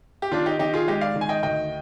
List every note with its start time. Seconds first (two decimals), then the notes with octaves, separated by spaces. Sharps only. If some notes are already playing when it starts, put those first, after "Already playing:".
0.22 G4
0.32 D#3 D4 F4
0.46 D#4 G4
0.59 D#3 D#4 G4
0.74 F4 G#4
0.87 G#3 D#4 G4
1.01 D5 F5
1.16 D#3
1.21 G#5
1.29 D#5 G5
1.43 D2 D#5 G5